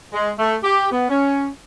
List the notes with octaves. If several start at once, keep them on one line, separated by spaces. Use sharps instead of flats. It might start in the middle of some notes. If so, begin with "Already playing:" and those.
G#3
A3
G4
B3
C#4